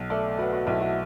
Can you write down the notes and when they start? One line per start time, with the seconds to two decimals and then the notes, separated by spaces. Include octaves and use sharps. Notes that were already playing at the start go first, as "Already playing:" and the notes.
Already playing: B1
0.10 A3 A4 D5
0.38 A3 F#4 B4
0.53 F#4
0.67 B1 E4
0.81 F#4